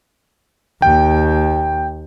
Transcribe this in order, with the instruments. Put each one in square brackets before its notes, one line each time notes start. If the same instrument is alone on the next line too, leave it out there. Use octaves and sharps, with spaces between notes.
[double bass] D#2 [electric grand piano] G5